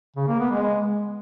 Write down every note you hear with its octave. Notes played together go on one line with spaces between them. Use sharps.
C#3
A#3
B3
G#3